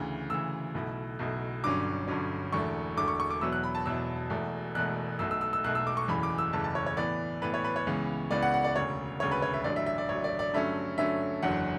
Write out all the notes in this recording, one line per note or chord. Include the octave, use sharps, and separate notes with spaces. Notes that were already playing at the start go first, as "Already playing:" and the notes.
Already playing: D2 C#3 E3
D2 C#3 E3 E6
B1 B2 A3 E4
B1 B2 A3 E4
G1 G2 D3 F#3 C#4 D6
G1 G2 D3 F#3 C#4
E1 E2 D3 A3 C#6
E1 E2 D3 A3 D6
C#6
C#6
D6
E2 B2 F#3 B3 E4 E6
F#6
B5
A5
E2 B2 F#3 B3 E4 E6
E1 E2 B2 A3
E1 E2 B2 A3 F#6
B1 B2 A3 E6
E6
E6
E6
B1 B2 A3 F#6
E6
D6
C#6
F#1 E2 C#3 E3 A3 B5
D6
E6
F#1 E2 C#3 E3 A3 A5
A5
C#5
C#5
A2 E3 B3 D5
A2 E3 B3 B4
C#5
B4
C#5
C#2 C#3 E3 B3
C#2 C#3 E3 B3 D5
F#5
F#5
D5
E1 D2 C#3 C#5
E1 D2 C#3 C#5
B4
C#5
E5
A1 G2 D3 F#3 D5
E5
E5
D5
A1 G2 D3 F#3 C#5
D5
D5
G2 D3 F#3 A3 C#4 E5
G2 D3 F#3 A3 C#4 E5
F#1 E2 D3 F#3 F#5